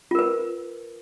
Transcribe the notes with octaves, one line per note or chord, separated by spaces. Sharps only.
F4 A#4 B4